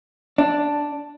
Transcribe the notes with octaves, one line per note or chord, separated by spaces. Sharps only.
D4